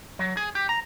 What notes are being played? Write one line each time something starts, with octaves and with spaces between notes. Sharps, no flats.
F#3
G#4
G4
A#5